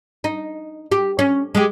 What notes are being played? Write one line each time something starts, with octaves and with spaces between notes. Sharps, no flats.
D#4
G4
C#4
G#3 G4